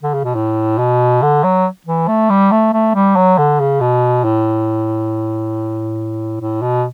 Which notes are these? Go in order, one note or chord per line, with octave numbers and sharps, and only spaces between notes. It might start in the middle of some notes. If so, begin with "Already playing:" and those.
D3
C#3
B2
A2
B2
D3
F#3
E3
A3
G3
A3
A3
G3
F#3
D3
C#3
B2
A2
A2
B2